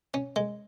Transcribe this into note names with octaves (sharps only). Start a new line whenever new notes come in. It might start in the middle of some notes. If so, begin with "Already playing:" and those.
C#4
G#3